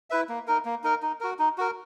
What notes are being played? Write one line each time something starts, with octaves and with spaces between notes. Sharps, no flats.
E4 B4 E5
A#3
D#4 A#4
A#3
D#4 A#4
D#4
F#4 A#4
D#4
F#4 A#4